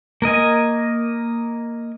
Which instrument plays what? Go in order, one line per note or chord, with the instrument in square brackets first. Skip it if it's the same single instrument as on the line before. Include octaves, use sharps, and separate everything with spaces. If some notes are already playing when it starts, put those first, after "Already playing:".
[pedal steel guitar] A#3 A#4 D#5 G#5